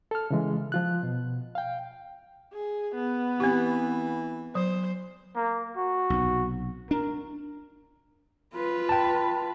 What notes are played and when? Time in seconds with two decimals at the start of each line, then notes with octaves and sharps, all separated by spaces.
0.11 A4 F6
0.30 C#3 E3 G#3
0.72 F3 F4 F#6
1.03 B2
1.55 F5 G5
2.53 G#4
2.95 B3
3.40 E3 C4 G4
4.55 F#3 C5
5.36 A#3
5.77 F#4
6.10 B1 C3
6.91 D4 A#4
8.54 F4 B4
8.89 G5 A5